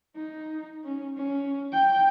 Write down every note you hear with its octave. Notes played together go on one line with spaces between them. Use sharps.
D#4
C#4
C#4
G5